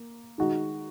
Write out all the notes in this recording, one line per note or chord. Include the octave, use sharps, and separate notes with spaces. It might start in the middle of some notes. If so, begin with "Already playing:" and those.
Already playing: A#3
D#3 G#3 D#4 F#4